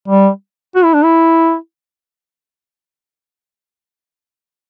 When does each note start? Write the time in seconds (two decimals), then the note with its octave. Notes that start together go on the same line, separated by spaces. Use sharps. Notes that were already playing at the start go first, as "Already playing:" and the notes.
0.08 G3
0.75 F#4
0.84 E4
0.94 D4
1.03 E4